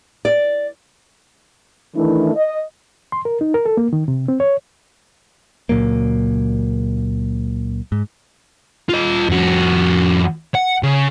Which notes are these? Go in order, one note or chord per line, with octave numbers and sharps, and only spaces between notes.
D5
D#3 E3 A3 D4 E4
D#5
C6
A#4
D#4
A#4
A4
A#3
D#3
C3
C4
C#5
C#2 A#2 F#3 A#3
G#2
F4 D#5
F2 F#4
F#5
C#3